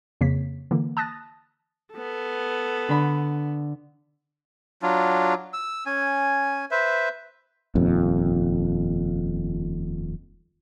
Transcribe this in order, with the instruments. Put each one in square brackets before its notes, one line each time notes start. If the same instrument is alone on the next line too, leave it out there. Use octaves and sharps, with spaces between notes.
[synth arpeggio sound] F2 C#3 A#3 C#5 B6
D3 E3 A#3
A5 D#6 F#6 A6 A#6
[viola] B3 A4
[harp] D3 B5
[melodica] F#3 D4 F4
E6
C#4 G#5
B4 C5 E5
[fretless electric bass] D#1 F2